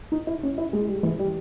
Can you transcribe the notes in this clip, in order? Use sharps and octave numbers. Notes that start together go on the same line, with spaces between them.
D#4
E4
C#4
E4
G#3
G3
E3
G3